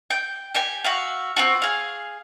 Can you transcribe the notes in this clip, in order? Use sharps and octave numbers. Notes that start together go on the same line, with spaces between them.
G5
G4 G5 G#5
F#4 E5 F5
C4 F4 F#4
G#4 F5